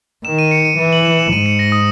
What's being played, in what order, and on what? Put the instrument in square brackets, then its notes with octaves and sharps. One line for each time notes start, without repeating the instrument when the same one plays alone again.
[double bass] D#3 [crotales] E7
[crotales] D#7
C#7
D#7
[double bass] E3 [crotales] D#7
[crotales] F#7
E7
E7
[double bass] G#2 [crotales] D#7
[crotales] C#7
A#6
D#6